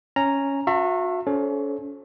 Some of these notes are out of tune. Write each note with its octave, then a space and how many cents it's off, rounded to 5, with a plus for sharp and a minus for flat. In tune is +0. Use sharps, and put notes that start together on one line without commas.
C#4 +0 A#5 +0
F#4 -35 E5 +25 A5 +40
C#4 +35 A4 -30 C5 +40